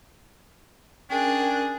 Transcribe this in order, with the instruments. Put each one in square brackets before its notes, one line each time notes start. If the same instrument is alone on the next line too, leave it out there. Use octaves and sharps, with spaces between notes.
[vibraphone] C#4 A#4 [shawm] D4 [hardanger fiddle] G#4 [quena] G5